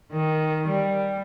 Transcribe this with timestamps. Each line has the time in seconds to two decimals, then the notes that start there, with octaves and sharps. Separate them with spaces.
0.12 D#3
0.68 G3